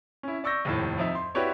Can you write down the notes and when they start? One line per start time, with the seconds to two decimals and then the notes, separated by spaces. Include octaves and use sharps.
0.23 C#4 E4
0.44 D5 C#6 E6 G6 A#6
0.65 F1 D#2 A2
0.98 F2 D#4 E5
1.15 C6
1.35 E4 F#4 G4 B4 C#5 D5